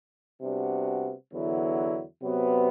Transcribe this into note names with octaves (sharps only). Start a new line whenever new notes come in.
C3 G3 B3 D4 F#4
E2 D3 F#3 B3 E4
C3 F#3 B3